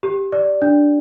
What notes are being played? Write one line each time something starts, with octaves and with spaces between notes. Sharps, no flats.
G4
D5
D4